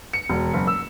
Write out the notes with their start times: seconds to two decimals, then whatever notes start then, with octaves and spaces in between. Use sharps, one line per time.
0.13 C#7
0.30 E1
0.53 F#1
0.67 E6